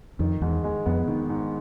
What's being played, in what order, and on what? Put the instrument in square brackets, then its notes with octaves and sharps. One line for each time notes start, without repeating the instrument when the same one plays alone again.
[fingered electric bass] F2 [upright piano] D#3
[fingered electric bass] E2 [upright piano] G#2
[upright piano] G#3
[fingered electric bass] F2 [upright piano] B3
[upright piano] D#3
G#2